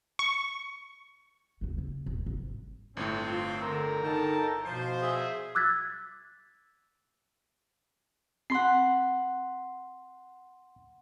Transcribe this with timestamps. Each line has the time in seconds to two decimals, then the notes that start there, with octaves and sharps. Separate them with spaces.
0.19 C#6
1.61 D2 C#3
1.78 C#3
2.06 D#1 C2
2.26 G#1
2.97 G1 A2 C4
3.27 F4
3.62 D3 A#4
4.04 D#4 A4 G5 A5
4.65 B2 F3 C5
5.02 G#4 E5
5.55 D6 E6 F#6 G#6 A6 B6
8.50 C4 F#5 B5 C6 C7